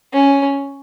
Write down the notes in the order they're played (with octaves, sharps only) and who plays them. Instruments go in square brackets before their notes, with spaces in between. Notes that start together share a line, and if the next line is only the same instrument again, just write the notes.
[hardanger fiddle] C#4